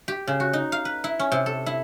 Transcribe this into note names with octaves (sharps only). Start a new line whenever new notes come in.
G4
C#3
F#4
D#4
F5
B4
E4
C#4
C3
A4
E4